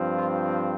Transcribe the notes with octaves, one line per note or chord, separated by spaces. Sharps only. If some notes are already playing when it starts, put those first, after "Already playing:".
Already playing: G2 F3 C4
F4